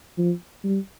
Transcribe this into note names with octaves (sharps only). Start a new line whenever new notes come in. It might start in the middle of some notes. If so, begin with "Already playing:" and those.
F3
G3